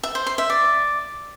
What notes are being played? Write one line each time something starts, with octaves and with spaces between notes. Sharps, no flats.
E5
C5
C6
E5
D5